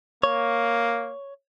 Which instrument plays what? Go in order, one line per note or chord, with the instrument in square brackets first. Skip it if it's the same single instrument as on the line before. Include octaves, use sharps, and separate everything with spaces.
[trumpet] A#3 [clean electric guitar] C#5